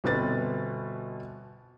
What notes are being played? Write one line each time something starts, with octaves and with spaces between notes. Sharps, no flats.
G1 B2 C4 B4 A6